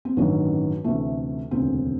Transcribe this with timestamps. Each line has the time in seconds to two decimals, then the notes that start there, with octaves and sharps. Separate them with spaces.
0.05 C4
0.17 A1 G2 D#3 F#3 C#4
0.84 D2 C3 E3 A3
1.51 E1 D2 C#3 E3 C4